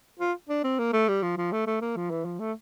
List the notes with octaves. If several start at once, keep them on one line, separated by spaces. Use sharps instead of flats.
F4
D4
C4
A#3
A3
G3
F3
F3
A3
A3
A#3
F3
E3
F3
A3